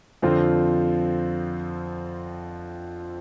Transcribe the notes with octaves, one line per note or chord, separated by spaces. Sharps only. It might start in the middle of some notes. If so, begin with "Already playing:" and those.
F2 D3 F3 C4 F4